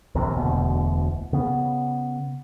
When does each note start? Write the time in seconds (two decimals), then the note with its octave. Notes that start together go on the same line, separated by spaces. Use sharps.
0.15 A#1 D#2 C3
0.37 E1 D2 B2
1.33 C#3 B3